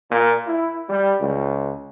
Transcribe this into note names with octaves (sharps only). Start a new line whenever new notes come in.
A#2
E4
G3
C#2